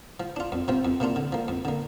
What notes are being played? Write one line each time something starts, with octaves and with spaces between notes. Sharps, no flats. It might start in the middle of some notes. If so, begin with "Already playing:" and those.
F3
D4 F4
F2
C3 F3 C4
F2
C3 A#3 D4 F4
D3
F3 A#3
F2
D3 A#3